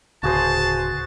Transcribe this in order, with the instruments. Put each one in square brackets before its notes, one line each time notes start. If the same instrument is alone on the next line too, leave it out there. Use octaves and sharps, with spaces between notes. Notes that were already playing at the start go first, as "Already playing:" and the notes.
[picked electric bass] D1 [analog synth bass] C#3 [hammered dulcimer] F#4 G#4 C5 [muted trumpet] A5